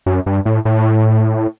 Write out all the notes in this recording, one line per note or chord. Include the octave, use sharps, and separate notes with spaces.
F#2
G2
A2
A2